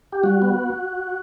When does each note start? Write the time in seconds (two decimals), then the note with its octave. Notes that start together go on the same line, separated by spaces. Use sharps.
0.12 G4
0.23 G3 F#4
0.42 B3